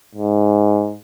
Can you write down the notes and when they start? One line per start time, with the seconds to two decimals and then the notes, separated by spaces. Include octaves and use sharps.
0.15 G#2